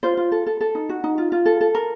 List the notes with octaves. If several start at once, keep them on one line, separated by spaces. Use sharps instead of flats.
F4 C5
F4
A4
A4
A4
D#4
F#4
D#4
F4
F4
A4
A4
A#4